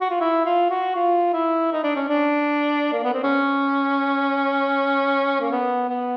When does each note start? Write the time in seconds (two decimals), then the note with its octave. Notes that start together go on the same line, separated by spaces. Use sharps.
0.01 F#4
0.10 F4
0.20 E4
0.45 F4
0.70 F#4
0.95 F4
1.33 E4
1.72 D#4
1.83 D4
1.96 C#4
2.08 D4
2.93 A#3
3.03 B3
3.13 C4
3.23 C#4
5.41 A#3
5.51 B3
5.89 B3